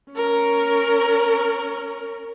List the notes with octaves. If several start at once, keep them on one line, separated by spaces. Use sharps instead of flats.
C#4 A#4